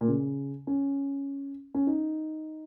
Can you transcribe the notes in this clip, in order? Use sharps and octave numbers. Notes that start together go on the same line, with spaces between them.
A#2
C#3
C#4
C#4
D#4